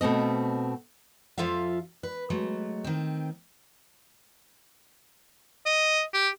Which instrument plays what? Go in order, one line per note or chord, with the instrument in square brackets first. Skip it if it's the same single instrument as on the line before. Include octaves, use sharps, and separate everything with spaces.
[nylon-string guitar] B2 A3 C4 D#5
[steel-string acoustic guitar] F2 F3 F4 A4 E5 F5
B4
F#3 G#3 A3
D#3 C4
[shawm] D#5
G4